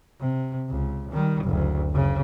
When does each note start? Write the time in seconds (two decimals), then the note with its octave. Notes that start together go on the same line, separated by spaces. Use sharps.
0.19 C3
0.69 C#2
1.12 D#3 G3
1.44 F#1 D2
1.91 F#1 C#3